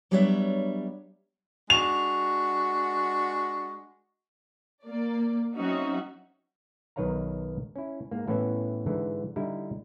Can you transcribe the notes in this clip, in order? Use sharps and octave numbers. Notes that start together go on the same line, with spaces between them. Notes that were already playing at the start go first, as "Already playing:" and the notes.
F#3 G3 B3 D4 C#5 E5
G#3 D4 F#4 F7
A#3 D5
F#3 C4 C#4 D#4 F#4 E5
B1 D#3 B4 C#5 F5 A#5
C#4 E4
G#2 A#3
A2 E3 B3 C#4 C#5 E5
G#2 D3 E3
D3 G3 D#4 E4 G4